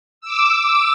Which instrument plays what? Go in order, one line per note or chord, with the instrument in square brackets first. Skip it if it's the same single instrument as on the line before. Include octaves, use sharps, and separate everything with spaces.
[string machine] D6 E6